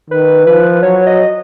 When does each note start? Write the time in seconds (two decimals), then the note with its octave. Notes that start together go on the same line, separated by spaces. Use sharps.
0.10 D#3 B4
0.46 F3 B4
0.83 F#3 C#5
1.07 D#5